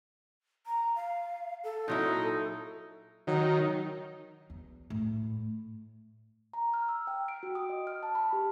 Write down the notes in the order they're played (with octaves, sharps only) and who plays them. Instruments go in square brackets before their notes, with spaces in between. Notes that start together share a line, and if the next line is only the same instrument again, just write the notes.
[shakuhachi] A#5
F5
A4
[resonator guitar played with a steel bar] A#2 F#3 E4 [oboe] D#4
[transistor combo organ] D#3 [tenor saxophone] F#3
[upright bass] E2
A2
[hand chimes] A#5
F6
E6
G5
D7
F#4
D#6
D#5
F6
A5
B5
G4